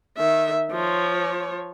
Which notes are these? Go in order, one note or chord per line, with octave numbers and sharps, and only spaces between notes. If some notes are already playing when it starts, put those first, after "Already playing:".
D#3 E5
F3 C#5